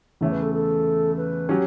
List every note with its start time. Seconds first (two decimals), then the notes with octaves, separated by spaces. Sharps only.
0.21 E2 C#3 E3 A3 C#5
0.32 B4
0.42 A4
0.54 A4
1.17 B4
1.49 F#3 C#4 G4